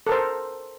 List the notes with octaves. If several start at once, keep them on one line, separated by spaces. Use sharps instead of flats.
A4 A#4 C5